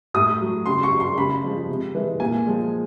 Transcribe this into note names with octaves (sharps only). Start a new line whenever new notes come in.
A2 D#6
F#3
C#3 C6
C#6
F#3
C6
C#3 B5
F3 G#3
C3
E3 G#3
A#2 G#5
F3 G#3